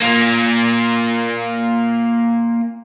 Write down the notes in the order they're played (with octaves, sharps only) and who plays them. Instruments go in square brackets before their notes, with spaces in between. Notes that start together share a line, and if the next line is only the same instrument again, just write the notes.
[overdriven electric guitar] A#3 F4